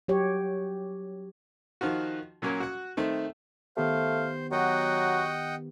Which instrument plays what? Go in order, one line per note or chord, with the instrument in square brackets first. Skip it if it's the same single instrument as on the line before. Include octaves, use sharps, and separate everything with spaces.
[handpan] F#3 G4 C#5
[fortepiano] D#3 F3 F4 F#4
A#2 F#3 A#3 C#4 A#4
F#4 F#5
D#3 A3 C4
[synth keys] D#3 B3 G4 [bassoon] A3 [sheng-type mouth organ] C5 [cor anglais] F5
[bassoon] F#3 [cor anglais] F#4 [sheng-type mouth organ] D#5 F#5 G5